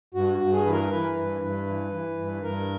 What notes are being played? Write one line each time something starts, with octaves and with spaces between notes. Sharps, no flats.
G2 F#4
F#4
G2
G#4
E3 B4
A#4
E3 B4
G2
G2
E3
E3
G2
G2 A#4